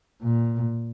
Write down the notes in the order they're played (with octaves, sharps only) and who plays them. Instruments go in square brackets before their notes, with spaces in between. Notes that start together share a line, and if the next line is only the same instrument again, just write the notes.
[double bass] A#2